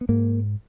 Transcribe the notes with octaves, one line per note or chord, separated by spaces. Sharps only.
B3
G#2 A#3